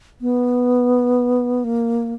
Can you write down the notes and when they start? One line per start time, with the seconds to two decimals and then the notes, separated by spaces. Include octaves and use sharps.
0.21 B3
1.64 A#3